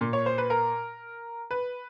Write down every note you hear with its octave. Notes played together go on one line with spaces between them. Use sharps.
A#2
C#5
C5
B4
A#4
B4